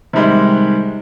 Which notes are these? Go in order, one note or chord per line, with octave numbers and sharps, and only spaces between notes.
C3 D#3 G3 G#3